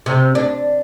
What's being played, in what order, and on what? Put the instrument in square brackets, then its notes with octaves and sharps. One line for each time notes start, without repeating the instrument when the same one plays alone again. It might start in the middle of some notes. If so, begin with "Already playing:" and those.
[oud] C3
D4